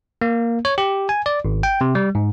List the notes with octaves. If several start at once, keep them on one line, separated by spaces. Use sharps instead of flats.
A#3
C#5
G4
G#5
D5
G#1
G5
C3
G3
G#2